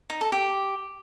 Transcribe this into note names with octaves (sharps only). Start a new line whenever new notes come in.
D#4
A4
G4